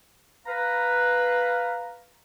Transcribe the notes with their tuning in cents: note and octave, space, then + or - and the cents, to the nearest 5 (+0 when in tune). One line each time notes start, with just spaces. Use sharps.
B4 +0 F5 +0 A#5 +0